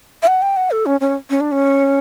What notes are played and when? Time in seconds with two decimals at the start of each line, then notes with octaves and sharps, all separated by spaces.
0.23 E5
0.27 F#5
0.42 G5
0.57 F#5
0.71 A4
0.86 C#4
1.01 C#4
1.30 C#4
1.41 D4
1.52 C#4